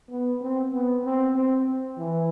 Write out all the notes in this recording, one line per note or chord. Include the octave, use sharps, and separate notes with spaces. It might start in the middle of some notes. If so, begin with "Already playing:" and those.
B3
C4
B3
C4
C4
E3